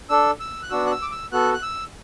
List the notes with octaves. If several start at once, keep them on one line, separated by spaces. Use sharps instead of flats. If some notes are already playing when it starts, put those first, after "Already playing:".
D4 A4 E6
E6
F#6
B3 D4 F#4 E6
F#6
E6
D6
E6
B3 F#4 A4 F#6
F#6
E6